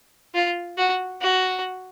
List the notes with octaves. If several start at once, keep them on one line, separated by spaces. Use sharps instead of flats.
F4
F#4
F#4